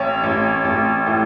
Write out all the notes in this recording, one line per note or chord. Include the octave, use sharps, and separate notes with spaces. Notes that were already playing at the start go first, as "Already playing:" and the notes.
Already playing: A1 C#5
A1
A1
A2